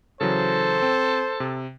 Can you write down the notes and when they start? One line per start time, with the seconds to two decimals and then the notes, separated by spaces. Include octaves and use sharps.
0.21 C#3 E3 F#3 A4 C5
0.82 C4
1.40 C3